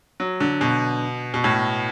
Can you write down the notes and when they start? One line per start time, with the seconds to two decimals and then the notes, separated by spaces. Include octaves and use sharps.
0.20 F#3
0.40 D3
0.61 B2
1.34 B2
1.44 A2